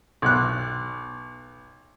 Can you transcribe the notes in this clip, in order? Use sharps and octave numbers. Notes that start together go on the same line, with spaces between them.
B1 F#6